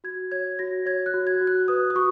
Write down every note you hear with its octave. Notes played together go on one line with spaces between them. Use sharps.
F#4 G#6
C#5 G#6
F#4 A#6
C#5 G#6
F#6
F#4
G#6
F#4
F#6
B4 D#6
D#6
F#4 C#6